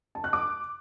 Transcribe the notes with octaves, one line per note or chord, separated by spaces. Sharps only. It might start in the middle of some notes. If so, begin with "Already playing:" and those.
A5
F#6
D6